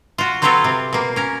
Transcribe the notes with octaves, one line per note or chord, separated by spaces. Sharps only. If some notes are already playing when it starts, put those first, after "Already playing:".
F4 F#4
F#3 C4 F4 A4 B4 C#5
C3
B2 A#3
C#4 A#4